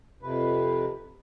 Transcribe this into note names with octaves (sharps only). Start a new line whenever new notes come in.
F2 C3 B4